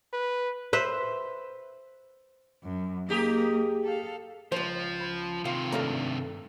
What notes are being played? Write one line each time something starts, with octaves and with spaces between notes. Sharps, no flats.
B4
B4 C5 E5
F#2
A#3 D#4 G4 G#4
A4 F5
C#2 F3 C5
B5 G#6
C3 D#3 F4 F5 C6
G2 A3 D4 A4 F5 A#5